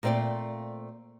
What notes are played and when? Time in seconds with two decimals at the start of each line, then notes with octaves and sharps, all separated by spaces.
0.03 A#2 A3 C4 D5 F5